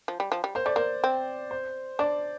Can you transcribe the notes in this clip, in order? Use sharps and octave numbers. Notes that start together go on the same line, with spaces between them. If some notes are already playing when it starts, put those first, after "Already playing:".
F3
G3
F3
G3
A#3 C5
A3 D5
A#3 C5
C4
C5
D4 D5